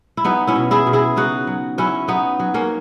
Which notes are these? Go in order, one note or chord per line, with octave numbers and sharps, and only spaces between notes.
E4
F#3 B3 D#4
C#4 E4
B2
E4 G#4
B2
E4 G#4
C#3 D#4 F#4
F#3
F#3 C#4 E4
F#3 B3 D#4
F#3
A#3 C#4